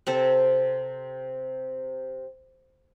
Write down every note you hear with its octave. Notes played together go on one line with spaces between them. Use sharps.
C3 C4 A4